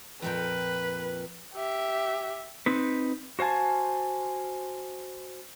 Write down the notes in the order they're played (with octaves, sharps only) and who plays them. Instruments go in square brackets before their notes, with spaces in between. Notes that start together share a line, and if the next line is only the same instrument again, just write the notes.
[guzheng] F2 A#2 G5 [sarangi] B4
[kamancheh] G4 E5
[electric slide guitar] C4 D#4 B4
F#4 C5 F5 G#5 A5